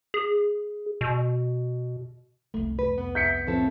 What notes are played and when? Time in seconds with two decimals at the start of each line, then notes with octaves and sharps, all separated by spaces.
0.14 G#4
1.01 B2
2.54 C2 F2 A3
2.79 B4
2.98 B3
3.15 E5 G6 B6 C#7
3.47 A2 F3 C4 E4 A4 B4